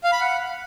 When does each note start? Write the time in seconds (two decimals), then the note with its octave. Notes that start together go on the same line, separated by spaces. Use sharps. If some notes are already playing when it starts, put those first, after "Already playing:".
0.04 F5
0.12 B5
0.21 F#5